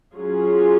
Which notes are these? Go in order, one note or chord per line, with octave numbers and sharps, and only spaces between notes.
F#3 C#4 F4 G#4